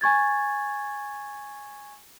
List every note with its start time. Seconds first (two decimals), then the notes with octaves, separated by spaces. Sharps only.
0.01 G#5 C#6 G#6 A6